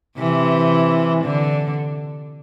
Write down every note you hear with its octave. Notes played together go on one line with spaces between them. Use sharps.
C3 E3
D3